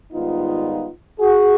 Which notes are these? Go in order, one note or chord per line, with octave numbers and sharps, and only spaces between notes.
G#2 D#3 G3 B3 D#4 F4
F#4 G#4